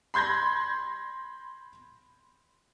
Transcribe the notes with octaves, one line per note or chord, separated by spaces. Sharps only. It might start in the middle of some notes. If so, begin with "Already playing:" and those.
B5 C6 G6 G#6 A#6